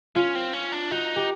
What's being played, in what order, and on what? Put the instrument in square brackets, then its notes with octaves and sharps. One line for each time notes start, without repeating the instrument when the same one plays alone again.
[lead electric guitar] C#4 [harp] F4
[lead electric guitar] C4
C#4
D4
[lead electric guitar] D#4 [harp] F#4
[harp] G4